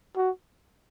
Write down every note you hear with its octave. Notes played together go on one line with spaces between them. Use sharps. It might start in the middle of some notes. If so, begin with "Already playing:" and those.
F#4